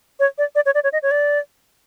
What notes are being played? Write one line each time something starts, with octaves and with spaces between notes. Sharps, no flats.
C#5
D5
D5
C#5
D5
C#5
D#5
C#5
D5